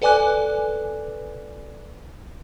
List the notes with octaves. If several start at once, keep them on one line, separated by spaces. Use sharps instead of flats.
A4 B4 D5 G#5 D6 F#6